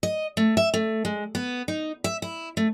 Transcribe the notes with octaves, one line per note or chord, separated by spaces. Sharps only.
D#5
A3
E5
A3
G#3
B3
D#4
E5
E4
A3